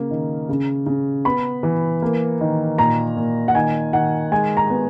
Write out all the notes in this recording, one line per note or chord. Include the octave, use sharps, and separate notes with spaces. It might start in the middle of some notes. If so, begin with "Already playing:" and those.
Already playing: C#3 A#3
D#3
C#3
C#3
B3 B5
E3
A#3
D#3
A#2 A#5
A#2
F#5
D#3 G#5
D#3 F#5
G#3 G#5
A#5
B3